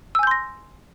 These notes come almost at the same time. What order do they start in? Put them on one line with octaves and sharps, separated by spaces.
E6 G#5 G6 C6 A#6